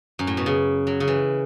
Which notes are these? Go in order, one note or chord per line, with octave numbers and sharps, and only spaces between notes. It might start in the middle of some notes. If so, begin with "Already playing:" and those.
F#2
A2
B2
C#3
F#3
C#3
E3